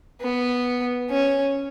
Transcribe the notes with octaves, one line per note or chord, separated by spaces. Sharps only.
B3
C#4